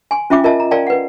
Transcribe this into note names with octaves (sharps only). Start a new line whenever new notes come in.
G#5 C6
C#4 F4 E5 G5 D6
F4 A#4 D#5 E5 A5
A#5
A#4 D5 F5 G5 A5 C6
B4 F#5